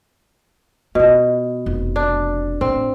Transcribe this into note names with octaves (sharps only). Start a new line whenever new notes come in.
B2 D#4 F4
F1
D4
A1 C4